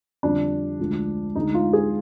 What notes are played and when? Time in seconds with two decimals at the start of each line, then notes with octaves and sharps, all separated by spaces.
0.23 F2 D3 G3 D4
0.79 D2 D3 F3 G#3
1.35 D2 D3 G#3 D#4
1.54 F4
1.73 G#4